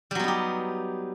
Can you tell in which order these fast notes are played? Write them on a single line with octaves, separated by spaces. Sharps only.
G3 F#3 B3 D#4 G4